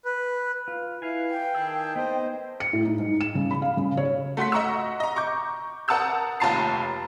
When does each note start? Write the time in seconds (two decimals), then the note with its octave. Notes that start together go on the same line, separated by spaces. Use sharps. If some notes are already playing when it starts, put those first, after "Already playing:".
0.05 B4
0.68 F4
1.02 E4 B4 F5 G#5
1.31 G5
1.55 D#3 G#4 A5 E6
1.96 B3 C4 D#4 C5 D#5
2.60 C#7
2.73 A2
2.85 D#4
2.99 G#2
3.21 E7
3.35 C#3
3.51 B5
3.62 F5
3.77 C#3
3.97 C#5
4.37 A3 F#4 C6 B6
4.52 D#5 F#5 A#5 C#6 E6
5.00 D#5 A#5
5.16 C#6 D6 G6
5.88 A#4 F#5 A5 D#6 E6 G6
6.40 F1 D#2 F4 A5 A#5 C7